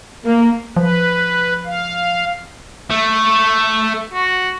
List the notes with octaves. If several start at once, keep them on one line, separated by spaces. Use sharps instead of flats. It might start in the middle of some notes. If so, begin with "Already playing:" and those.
A#3
F3 B4
F5
A3
F#4